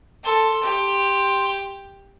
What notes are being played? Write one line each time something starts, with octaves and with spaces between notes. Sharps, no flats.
A4 C6
G4